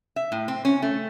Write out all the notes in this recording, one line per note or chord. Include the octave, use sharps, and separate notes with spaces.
E5
A2
C4
C#4
A3